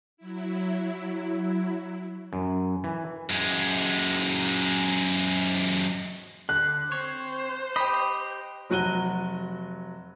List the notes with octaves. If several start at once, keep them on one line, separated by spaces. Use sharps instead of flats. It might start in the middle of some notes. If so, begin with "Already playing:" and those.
F#3 E4
F#2
E3
F#2 G#3
D3 F#6
C4 C5 C#5
G4 D#5 G5 B5
F1 F#3 F#4 F#6 D#7 G7